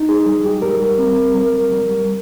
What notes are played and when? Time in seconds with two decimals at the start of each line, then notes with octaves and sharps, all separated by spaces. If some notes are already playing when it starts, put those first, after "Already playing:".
Already playing: D#4
0.09 G#4
0.26 G3 G#4
0.45 G4
0.62 G3 A#4
0.99 C4
1.35 G3 A#4
1.72 G3